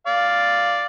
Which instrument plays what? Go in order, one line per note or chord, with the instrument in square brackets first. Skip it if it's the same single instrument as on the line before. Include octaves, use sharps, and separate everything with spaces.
[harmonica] D5 F5